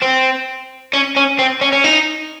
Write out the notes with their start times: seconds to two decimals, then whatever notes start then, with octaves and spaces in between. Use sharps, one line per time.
0.02 C4
0.94 C#4
1.17 C#4
1.39 C4
1.61 C#4
1.73 C#4
1.84 D#4